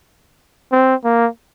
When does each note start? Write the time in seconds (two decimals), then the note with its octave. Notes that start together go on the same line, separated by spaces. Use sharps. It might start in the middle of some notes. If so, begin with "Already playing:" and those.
0.72 C4
1.04 A#3